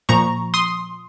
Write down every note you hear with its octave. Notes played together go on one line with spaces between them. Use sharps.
A#2 F3 A#5 C#6
C6 D#6